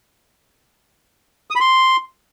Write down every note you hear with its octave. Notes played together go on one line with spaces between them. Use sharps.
D#6
B5
C6